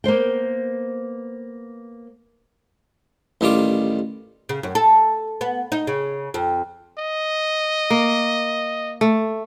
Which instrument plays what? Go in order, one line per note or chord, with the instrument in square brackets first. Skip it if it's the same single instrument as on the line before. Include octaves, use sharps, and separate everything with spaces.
[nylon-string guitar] A#3 B3 C5 G5
[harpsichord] A1 D#3 G3 F4 D6
[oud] C#3
F#2
A4
B3
D#4
C#3
F2
[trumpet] D#5
[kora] A#3
A3